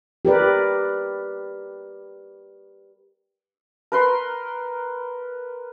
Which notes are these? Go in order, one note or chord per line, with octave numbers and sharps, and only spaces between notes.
G4 A#4 B4 D5
A#4 B4 C6